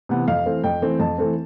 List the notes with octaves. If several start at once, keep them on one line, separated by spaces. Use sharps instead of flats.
C3 E3 B3
F2 F5
E3 A3 C4
F2 G5
E3 A3 C4
F2 A5
E3 A3 C4